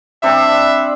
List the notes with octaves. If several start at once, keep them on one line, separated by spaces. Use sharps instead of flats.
G3 C4 D4 E5